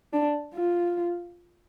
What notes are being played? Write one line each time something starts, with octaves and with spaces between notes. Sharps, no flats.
D4
F4